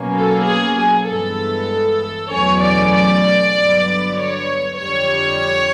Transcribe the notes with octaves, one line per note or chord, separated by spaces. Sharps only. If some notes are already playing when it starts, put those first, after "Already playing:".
Already playing: B2 F#3 A#3 C#4
A4
G#4
G#4
G2 E3 G#3 B3 A4
E2 B2 F#3 A3 C#4 C#5
D5
D5
G2 D3 F#3 B3
C#5
F2 D3 G3 C#5